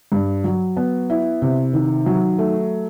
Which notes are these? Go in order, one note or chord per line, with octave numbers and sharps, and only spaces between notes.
G2
F#3
B3
E4
C3
D#3
F#3
A3